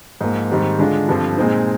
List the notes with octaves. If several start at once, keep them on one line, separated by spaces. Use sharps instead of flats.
G#2 F3 A#3
G#2 D#3 G3 C4
D3 G#3 D4 F4
G2 D3 F3 C4
A#2 G#3 C4 D#4